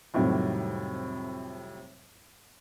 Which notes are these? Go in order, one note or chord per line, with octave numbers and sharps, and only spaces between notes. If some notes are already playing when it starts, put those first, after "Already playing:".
F2 A2 C3 D#3 F#3 G3